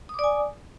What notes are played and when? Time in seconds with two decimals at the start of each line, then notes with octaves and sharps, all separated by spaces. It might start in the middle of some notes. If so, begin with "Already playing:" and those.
0.09 D#6
0.14 D6
0.19 D5
0.24 G#5